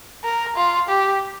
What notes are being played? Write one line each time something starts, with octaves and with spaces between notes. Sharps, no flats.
A#4
F4
G4